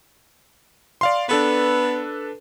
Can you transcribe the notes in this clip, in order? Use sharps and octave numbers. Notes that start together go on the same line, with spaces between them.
D5 F5 C6
B3 D4 A4 B4